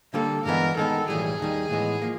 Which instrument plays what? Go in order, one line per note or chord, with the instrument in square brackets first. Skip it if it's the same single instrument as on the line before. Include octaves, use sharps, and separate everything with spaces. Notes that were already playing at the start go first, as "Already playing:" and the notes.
[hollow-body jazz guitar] D3 G3 A#3 [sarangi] A4
[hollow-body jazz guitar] G2 E3 G#3 B3 [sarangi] A#4
[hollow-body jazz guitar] D#3 G#3 B3 [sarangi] A4
[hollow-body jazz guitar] B1 A2 E3 G3 [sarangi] G#4
[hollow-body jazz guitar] D#2 D#3 G3
A2 E3 G#3 B3
F3 A#3